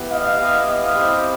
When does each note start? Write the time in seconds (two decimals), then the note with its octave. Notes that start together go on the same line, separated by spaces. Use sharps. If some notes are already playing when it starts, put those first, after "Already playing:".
Already playing: B3 E4 G4
0.11 D#5 F5
0.40 B3 E4 G4
0.67 D#5 F5
0.95 C4 E4 G4